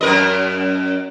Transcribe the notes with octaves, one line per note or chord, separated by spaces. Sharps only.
F#2 A#4 D#5